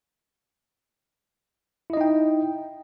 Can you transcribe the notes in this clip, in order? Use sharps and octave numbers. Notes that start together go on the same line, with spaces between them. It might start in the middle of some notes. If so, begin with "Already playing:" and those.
D#4 E4 D#5 G5